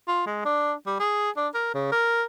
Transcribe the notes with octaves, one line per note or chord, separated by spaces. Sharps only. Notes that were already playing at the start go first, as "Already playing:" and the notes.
F4
G#3
D4
G3
G#4
D4
A#4
C#3
A#4